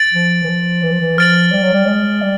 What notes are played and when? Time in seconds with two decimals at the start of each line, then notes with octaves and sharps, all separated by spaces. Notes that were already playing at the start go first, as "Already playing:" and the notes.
Already playing: A6 D7 F#7
0.14 F3
0.44 E3
0.49 F3
0.83 E3
0.92 F3
1.01 E3
1.18 F3 F6 A6 D7 F#7
1.53 G3
1.63 F#3
1.74 G3
1.87 G#3
2.22 G3